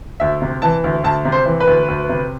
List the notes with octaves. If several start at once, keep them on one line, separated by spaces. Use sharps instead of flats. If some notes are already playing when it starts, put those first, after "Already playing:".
D2 E5
C3
E3 A5
D2
D2 A5
C3
C5
E3
B4
D2
D2
C3